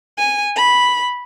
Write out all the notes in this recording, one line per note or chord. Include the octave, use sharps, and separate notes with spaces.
G#5
B5